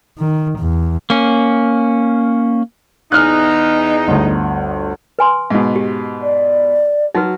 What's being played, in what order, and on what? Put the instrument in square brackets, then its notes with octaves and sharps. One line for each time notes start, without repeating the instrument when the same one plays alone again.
[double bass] D#3
E2
[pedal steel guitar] A#3 C#4
[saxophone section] E2 D#4 [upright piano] G#5 F6 F#6
[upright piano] G1 D2
[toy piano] B4 G#5 C6
[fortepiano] G#2 B2
[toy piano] G4
[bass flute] D5
[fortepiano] F#3 [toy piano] D#4 F#4 B4